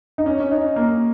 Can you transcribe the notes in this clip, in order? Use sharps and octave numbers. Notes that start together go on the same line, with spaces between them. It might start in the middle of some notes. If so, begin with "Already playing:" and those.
D#4
C#4
C#4
D#4
A#3